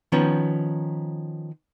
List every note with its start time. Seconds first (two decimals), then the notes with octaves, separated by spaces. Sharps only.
0.12 D#3 F3 B3 C#4